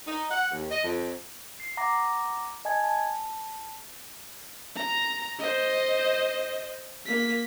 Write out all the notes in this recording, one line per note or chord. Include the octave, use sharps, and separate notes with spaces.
D#4
F#5
D#2
D#5
F2
C7
F#5 A#5 D6 A#6
D#5 G#5 A5 G#6
A5
A#5
C5 D#5
A#3 B6